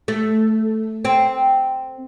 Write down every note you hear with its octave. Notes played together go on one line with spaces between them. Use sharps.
A3
C4